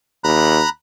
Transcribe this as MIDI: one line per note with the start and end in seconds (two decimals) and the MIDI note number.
0.24 0.62 39
0.24 0.69 82
0.24 0.69 83
0.24 0.69 90